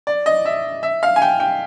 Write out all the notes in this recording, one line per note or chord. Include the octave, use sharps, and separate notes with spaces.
D5
D#5
E5
E5
F5
G#5
G5
G5